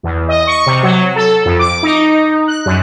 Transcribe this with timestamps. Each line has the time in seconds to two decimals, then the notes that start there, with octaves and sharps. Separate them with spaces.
0.03 E2
0.28 D#5
0.47 C#6
0.66 C3
0.83 F#3
1.16 A4
1.45 F2
1.59 D6
1.83 D#4
2.48 F#6
2.66 F#2